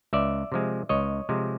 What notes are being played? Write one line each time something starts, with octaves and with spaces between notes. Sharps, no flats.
C#2 D5 E5
C3 F3 G#3
C#2 C#5 D#5
C3 F3 G#3